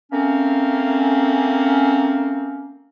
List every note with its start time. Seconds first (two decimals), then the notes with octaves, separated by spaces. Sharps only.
0.12 A3 A#3 C4 C#4